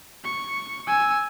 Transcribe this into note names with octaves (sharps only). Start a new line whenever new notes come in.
C#6
G#5 E6